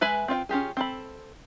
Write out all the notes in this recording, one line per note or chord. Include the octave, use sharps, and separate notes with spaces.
G#3 B4 E5 G#5 B5
C4 F4 E5 G5
C#4 F4 G4 G#4
C4 A4 B5